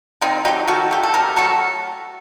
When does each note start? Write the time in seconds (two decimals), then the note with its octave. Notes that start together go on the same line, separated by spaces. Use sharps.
0.21 D#3 C4 D#4
0.45 F#3 A3 D#4 G4
0.68 D#3 F#4 A4
0.91 A3 G4
1.03 A4
1.14 C3 G4 A#4
1.36 F#3 A3 F#4 A4